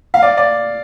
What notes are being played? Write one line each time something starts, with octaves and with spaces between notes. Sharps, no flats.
F5
D5
D5